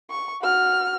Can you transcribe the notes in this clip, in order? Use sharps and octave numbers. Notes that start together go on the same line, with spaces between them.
C#6
F#4 F6